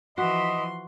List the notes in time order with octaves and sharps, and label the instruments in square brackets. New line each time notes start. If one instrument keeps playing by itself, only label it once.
[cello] E3 F3 [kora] F#4 [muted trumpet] D#5 [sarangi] C6